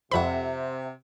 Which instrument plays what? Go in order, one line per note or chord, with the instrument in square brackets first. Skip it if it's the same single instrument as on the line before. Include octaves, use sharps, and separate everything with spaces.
[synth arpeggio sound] F2 B5 [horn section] C3 [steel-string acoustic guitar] C5 E5 F#5